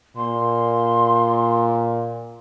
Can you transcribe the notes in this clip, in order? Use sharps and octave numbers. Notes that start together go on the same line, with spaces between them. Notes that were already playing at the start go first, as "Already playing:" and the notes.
A#2 C6